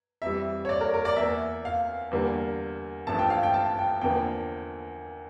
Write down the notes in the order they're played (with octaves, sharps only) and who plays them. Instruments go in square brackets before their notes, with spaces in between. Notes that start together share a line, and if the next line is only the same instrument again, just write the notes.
[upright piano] F2 E3 G3 E5
C#5
D5
A#4
A#4
D5
E2 E3 A#3 E5
F5
E2 D3 G3 A#3
A1 G2 F3 A3 A5
G5
F5
G5
A5
G5
E2 D3 F3 A#3 G5